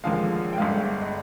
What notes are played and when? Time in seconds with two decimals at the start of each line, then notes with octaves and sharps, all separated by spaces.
0.04 D#2 D3 F3 G#3 F5
0.53 G5
0.58 G1 G2 D3 G#3 F5
1.01 D#5